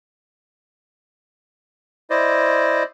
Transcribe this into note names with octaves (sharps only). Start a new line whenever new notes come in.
E4 C5 D5 D#5